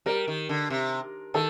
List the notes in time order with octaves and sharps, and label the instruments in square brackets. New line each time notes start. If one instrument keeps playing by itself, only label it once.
[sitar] G3 [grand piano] A#4
[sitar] D#3
D3
C3
[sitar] D#3 [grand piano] A4